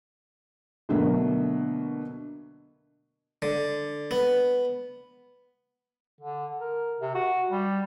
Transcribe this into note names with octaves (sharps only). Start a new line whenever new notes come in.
B2 D3 F#3 A3 A#3
D3
B3
D3
A#4
C3
F#4
G3